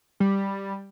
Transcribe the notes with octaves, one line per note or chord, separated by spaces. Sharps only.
G3